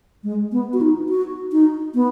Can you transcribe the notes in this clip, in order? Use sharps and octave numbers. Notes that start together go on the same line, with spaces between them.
G#3
B3
F#4
D#4
F#4
D#4
B3